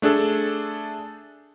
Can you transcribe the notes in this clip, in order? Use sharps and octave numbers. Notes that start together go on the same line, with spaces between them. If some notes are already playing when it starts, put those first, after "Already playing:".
A3 D4 G#4 A4